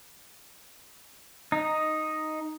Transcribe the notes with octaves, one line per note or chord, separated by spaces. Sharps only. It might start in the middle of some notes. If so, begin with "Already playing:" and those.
D#4